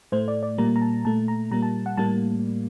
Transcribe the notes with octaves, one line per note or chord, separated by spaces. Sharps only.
A2 A3 C5
D5
D5
A#2 G3 A#3 A#5
A#5
A5
A#2 A3 A5
A#5
A#2 G3 A#3 A#5
A5
F#5
A2 G3 A#3 A5